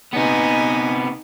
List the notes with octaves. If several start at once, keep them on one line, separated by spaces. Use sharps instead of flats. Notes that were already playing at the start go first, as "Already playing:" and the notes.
C3 B3 D#4 G#5